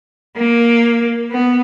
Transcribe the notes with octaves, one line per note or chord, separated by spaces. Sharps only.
A#3
B3